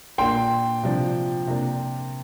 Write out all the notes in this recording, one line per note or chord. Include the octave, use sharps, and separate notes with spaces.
A#2 A#3 D4 G5 C6
C3 F3 D4
C3 A#3 D4